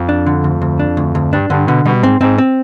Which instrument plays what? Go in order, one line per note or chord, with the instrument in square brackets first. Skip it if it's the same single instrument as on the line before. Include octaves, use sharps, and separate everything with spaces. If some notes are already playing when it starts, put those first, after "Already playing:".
Already playing: [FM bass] F2
[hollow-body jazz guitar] D4
D3
D2
D2
D4
D2
D2
[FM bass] G2 [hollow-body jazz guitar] D4
[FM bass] G2 [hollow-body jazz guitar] D3
[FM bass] B2 [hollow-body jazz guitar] D3
[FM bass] B2 [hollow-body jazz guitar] G3
[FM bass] G#2 [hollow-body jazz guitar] C4
[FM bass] G#2 [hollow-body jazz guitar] C4
[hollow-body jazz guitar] C4